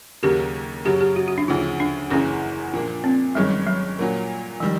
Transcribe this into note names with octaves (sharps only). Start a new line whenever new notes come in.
D#2 C#3 F#3 A#3 G4
F#2 C#3 F#3 G4
G4
F#4
F#4
D4
D2 C#3 F3 D#4
D4
F#1 E2 C#3 E3 C#4
A#2 F3 A#3 D4
C4
G1 G2 D#3 F#3 G#3 C#4
F#3
A#2 F#3 A#3
D#3 F3 G3